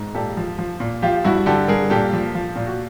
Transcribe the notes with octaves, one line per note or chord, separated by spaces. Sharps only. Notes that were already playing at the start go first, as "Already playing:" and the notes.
Already playing: G#2
A#2 G4 A4
F3
F3
A#2
F3 F4 G4
G2 E4 F#4
D3 G4 A4
G2 G#4 A#4
A#2 G4 A4
F3
F3
A#2
F#4